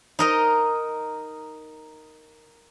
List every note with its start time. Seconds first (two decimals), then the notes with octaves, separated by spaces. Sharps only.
0.19 D#4 A#4 D#5